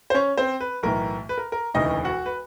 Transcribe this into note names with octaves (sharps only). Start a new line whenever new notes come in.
C5
C#4 C#5
C4 C5
B4
B1 A2 E3 A#4
B4
A#4
A#4
E1 D2 C#3 E3 D#4 D#5
F#4 F#5
B4